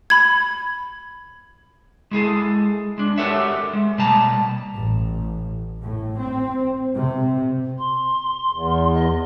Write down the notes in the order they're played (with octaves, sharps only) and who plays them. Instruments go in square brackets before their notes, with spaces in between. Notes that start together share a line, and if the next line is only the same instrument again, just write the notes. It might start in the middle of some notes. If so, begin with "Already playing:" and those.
[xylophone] B5 G#6
[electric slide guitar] G#3 E4 G#4 A4
G#3 D4
F#4 G4 A4 A#4 C#5 E5
G#3
B2 G3 A#3 A5 A#5
[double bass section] A1
A2
C4
C3
[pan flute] C6
[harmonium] E2
[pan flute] D#5